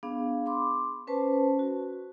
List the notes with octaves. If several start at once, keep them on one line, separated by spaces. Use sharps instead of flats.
B3 D4 G#4 F5
B5 C6 D6
C#4 B4 C5 A5
F#4